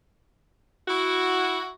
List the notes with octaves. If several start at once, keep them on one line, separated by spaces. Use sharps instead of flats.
E4 F#4